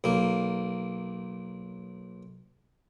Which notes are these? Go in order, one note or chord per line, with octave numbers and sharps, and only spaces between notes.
B1 A#3